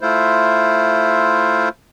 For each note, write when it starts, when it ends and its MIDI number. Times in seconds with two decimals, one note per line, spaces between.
0.01 1.69 57
0.01 1.69 64
0.01 1.69 65
0.01 1.69 72